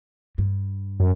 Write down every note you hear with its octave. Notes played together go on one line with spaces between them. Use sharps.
G2
F#2